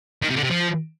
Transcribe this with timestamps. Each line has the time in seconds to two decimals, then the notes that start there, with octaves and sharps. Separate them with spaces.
0.22 D#3
0.29 C3
0.36 D3
0.43 C3
0.50 F3